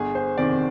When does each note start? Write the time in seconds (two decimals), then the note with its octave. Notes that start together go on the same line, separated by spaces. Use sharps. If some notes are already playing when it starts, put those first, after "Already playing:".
Already playing: G1 G#4
0.15 C5
0.37 F2 C3 D#3 D5